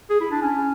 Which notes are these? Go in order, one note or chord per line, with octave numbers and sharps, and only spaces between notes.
G#4
E4
D4
C#4